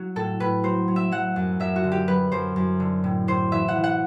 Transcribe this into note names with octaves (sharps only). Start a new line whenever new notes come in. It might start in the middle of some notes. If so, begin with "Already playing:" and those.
Already playing: F#3 F#4
A2 A4
A2 B4
F#3 C5
F#3
E5
F#3 F#5
F#2
F#2 E5
F#4
D3
G4
F#3 B4
F#2 C5
F#2
D3
A2
A2 C5
E3 E5
F#5
E3
F#5